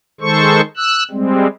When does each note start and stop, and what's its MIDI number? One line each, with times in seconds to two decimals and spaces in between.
0.21 0.61 51
0.21 0.61 56
0.21 0.61 69
0.21 0.61 72
0.21 0.61 85
0.77 1.03 88
0.77 1.03 90
1.11 1.47 55
1.11 1.47 56
1.11 1.47 60